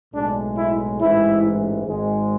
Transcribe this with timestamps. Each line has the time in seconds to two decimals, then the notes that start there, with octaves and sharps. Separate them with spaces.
0.13 B1 A2 G#3 D4
0.56 E4
1.00 A1 G#2 E3 G#3 E4
1.86 G#1 G#2 G#3